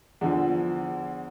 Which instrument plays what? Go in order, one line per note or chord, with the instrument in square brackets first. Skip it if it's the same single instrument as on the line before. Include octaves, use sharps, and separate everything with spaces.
[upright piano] E2 D3 F3